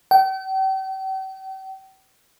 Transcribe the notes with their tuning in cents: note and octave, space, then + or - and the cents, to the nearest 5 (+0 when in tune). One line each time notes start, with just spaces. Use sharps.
G5 -40